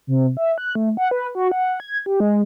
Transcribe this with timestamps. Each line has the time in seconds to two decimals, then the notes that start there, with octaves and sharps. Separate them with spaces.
0.07 C3
0.37 E5
0.58 F#6
0.75 A3
0.97 F#5
1.11 B4
1.35 F#4
1.52 F#5
1.80 G#6
2.06 G4
2.20 G#3